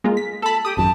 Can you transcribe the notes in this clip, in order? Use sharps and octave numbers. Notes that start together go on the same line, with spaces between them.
G#3 A#3 F4
B6
A4 A5 B5
G4 D#6
G#1 F#2 A5